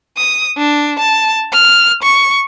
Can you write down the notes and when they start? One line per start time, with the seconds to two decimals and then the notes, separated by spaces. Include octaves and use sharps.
0.17 D#6
0.58 D4
0.99 A5
1.53 F6
2.02 C#6